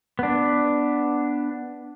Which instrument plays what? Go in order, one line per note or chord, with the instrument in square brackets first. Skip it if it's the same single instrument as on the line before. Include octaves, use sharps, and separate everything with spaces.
[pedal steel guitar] B3 D4